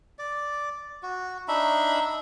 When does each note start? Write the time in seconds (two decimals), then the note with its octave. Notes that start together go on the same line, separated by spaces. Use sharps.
0.19 D5
1.03 F#4
1.48 D4 D#4 E5 B5